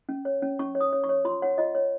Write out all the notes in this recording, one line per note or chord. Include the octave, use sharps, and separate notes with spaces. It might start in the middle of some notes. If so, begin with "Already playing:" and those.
C#4
C#5
C#4
C#4 C#6
C#5
D#6
C#5
C#6
C#5
F4 C6
C#5 F#5
F4 D#5
C#5